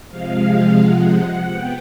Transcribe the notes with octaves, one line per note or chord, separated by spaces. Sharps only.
C3 F3 G#3 F5
F#5
F#5
B3 G5